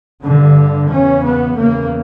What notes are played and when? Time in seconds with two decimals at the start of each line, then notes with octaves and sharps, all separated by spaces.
0.22 G2 D3
0.90 E2 C#3 C#4
1.24 B3
1.56 E2 C#3 A#3